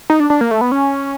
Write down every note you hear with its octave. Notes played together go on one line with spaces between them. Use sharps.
D#4
D4
D4
A#3
A3
B3
C#4